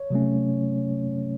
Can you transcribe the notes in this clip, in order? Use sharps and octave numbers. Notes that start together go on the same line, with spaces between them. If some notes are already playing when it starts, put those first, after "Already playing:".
Already playing: C#5
C3 F#3 A3 C#4